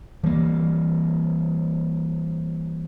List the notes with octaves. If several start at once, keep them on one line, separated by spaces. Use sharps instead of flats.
E3 G3 A#3